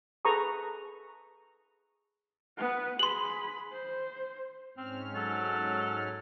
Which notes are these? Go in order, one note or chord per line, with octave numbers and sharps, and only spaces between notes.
G#4 A4 B4 A#5 C#6 D#6
B3 B4
G#4 B5 C6 F#7
C5
G#2 C4 C#4 F6
F#3 A4